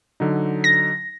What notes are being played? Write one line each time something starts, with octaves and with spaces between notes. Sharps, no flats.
D3 F#3 D#4
A#6